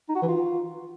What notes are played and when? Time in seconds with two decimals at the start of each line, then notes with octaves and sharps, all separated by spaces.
0.09 D#4
0.15 F#4
0.22 E3
0.28 F4